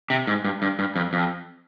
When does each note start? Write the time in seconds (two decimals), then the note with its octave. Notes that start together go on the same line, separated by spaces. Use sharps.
0.10 C3
0.27 G#2
0.45 G2
0.62 G2
0.79 G2
0.96 F2
1.13 F2